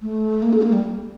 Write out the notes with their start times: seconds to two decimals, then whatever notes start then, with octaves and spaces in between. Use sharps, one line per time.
0.02 A3
0.42 A#3
0.53 A4
0.62 A#3
0.73 G3